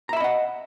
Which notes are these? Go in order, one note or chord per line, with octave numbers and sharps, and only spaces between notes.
D#5 E5 F#5 A#5 B5